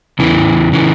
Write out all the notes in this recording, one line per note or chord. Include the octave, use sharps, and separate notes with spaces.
E2 C#3 E3
C#3 E3